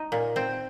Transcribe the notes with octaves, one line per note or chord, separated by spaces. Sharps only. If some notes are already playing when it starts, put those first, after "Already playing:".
Already playing: D#4
A#2
C4